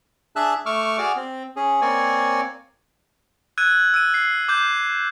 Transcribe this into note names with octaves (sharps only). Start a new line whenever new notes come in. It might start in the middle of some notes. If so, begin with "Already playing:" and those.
D4 G#4 E5 A5 E6 F#6
A3 C#6 D6 E6 F6
F#4 G#4 D5 D6 F6
C4
C#4 G#4
A#3 C4 C#5 D5 G#5
E6 F#6 G#6 D#7
E6 D#7
C7
D6 G6